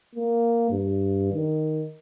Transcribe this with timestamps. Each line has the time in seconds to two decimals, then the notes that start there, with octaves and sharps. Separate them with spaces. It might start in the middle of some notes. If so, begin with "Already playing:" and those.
0.15 A#3
0.71 G2
1.33 D#3